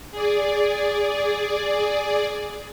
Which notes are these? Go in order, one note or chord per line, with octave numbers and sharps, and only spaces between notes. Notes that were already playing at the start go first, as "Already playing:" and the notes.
G#4 D5